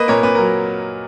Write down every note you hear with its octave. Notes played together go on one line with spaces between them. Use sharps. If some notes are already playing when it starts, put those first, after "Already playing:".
Already playing: A#3 B4 D#5
A#2 A#4 C#5
A#2 B4
F#3 A#4